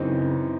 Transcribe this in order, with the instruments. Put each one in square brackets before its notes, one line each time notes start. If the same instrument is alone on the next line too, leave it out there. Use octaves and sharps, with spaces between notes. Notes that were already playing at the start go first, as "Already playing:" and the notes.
Already playing: [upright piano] F#2 E3 C4 D#4 [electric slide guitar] C#3